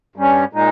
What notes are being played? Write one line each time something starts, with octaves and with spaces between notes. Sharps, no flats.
G2 G3 C#4
A#2 G#3 D#4